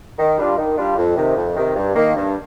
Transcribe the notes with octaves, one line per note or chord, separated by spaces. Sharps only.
D#3
G3 D4 F4
D#3
G3 D4 F4
F2
C3 D#3
F2
C3 D#3
G2
D#3 A#3
G2